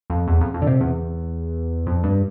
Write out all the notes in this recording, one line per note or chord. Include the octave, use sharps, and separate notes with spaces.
F2
E2
F2
F2
D3
C3
E2
F2
G2